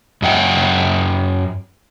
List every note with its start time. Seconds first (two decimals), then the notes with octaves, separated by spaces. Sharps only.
0.22 F#2 D#5 F#5 G5